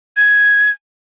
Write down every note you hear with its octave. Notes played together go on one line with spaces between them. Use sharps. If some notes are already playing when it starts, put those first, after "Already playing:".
G#6